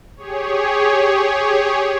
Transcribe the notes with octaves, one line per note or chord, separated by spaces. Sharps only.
G4 G#4 C#5